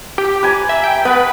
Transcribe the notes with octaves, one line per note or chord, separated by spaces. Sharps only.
G4
B4 G#5 A#5
E5
G5
B3 B4 F#5